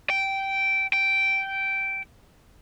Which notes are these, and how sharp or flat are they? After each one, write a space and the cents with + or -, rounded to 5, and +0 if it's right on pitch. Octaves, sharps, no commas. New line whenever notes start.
G5 -10
G5 -10